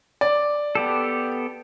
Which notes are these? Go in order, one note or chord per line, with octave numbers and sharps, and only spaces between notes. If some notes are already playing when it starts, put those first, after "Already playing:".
D5
B3 G4 A4